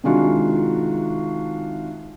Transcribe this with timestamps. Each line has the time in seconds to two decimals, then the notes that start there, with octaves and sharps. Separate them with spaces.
0.04 C3 D#3 G#3 D4 F4 F#4